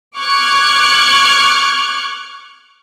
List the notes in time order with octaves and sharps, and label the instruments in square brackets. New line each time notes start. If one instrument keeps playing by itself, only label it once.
[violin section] C#6 D6 F6 F#6 G#6